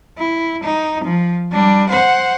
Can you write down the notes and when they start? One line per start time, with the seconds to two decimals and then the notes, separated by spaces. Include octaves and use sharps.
0.18 E4
0.63 D#4
1.04 F3
1.52 G3 D4
1.89 C5 F#5